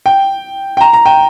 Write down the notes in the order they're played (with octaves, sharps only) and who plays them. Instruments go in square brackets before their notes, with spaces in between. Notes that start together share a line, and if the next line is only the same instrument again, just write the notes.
[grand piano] G5
G5
A#5
A#5
G5